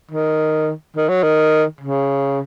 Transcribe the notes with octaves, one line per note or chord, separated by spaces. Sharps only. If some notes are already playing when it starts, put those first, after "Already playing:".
D#3
D#3
F#3
D#3
C#3